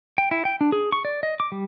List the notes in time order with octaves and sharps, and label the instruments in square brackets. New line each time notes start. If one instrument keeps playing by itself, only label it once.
[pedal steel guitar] G5
E4
G5
D4
G#4
C#6
D5
D#5
D6
G3